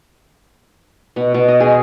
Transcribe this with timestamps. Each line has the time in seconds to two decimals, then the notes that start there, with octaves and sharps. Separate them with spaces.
1.16 B2
1.34 B2
1.48 D#5
1.60 G#4